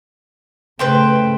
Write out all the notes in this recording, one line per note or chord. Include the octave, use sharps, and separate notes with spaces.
C#3 A3 B4 C5 G5